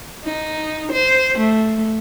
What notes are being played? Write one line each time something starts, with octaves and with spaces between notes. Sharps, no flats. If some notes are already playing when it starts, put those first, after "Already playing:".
D#4
C5
A3